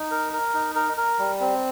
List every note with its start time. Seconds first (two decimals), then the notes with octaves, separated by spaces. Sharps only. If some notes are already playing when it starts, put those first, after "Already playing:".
Already playing: D#4
0.11 A#4
0.33 A#4
0.54 D#4
0.75 A#4
0.97 A#4
1.19 G3
1.40 C4